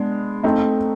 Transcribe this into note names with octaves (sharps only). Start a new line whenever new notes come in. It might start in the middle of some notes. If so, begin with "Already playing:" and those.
Already playing: G#3 B3 D4
A3 C4 D#4